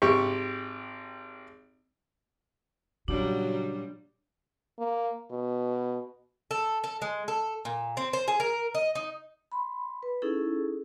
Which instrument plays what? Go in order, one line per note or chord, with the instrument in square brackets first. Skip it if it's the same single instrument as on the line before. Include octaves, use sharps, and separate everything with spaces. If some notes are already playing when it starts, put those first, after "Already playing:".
[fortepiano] G#1 G4 C#6
[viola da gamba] A#2 F#3 G3 [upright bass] C#3 [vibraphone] D4 [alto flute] F#4
[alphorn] A#3
B2
[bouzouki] A4
A4
G#3
A4
A#2
C4
C5
G#4
A#4
D#5
D#4
[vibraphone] B5 C6
B4
C#4 D#4 E4 G#4 A4